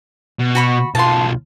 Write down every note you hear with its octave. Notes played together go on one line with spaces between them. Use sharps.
B2
F#4 B5 C#6
B1 F4 A5 C6